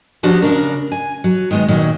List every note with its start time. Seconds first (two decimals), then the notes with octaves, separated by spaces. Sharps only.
0.23 F3 B3 D4 F#4 G4
0.42 C#3 D4 A#4
0.92 G#5
1.24 F#3
1.51 D#3 G#3 B3
1.68 A#2 D#3 F#3 F#4